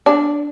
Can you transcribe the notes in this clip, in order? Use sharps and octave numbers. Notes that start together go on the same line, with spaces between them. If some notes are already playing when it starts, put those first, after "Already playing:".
D4